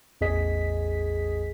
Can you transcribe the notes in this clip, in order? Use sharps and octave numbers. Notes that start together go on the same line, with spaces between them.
A1 E2 G#4 D#5 B6